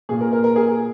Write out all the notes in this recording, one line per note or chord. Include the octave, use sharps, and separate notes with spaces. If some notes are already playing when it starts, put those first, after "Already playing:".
A#2 G#4
A#4
A#4
A#4
G#4